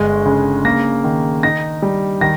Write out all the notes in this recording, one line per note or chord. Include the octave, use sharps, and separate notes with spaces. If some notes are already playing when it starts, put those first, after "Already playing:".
Already playing: G1 G#3
C#3
A#3 A#6
D#3
D#4 A#6
G3
D#3 A#6